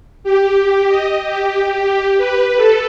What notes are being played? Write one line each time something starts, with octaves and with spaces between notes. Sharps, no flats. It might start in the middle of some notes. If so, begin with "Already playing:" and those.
G4
D#5
G4
G4
B4
A4